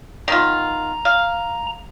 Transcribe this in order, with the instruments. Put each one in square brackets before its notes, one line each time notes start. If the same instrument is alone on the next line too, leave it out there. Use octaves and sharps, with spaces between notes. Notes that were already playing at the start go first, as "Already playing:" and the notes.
[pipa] D#3 B3 F4 [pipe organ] A#5
[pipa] F5